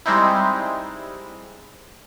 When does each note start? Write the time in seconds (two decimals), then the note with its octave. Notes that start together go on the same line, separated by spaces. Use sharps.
0.06 G3 G#3 C4 D#4 E4